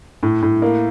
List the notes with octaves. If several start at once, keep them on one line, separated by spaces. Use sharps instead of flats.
A2
A2
A#3